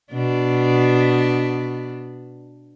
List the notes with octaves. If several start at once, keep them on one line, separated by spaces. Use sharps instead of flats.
B2 D4